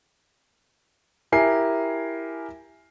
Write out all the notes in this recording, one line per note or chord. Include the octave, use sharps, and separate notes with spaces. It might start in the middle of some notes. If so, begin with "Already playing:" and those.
E4 G4 A#4 G#5 C7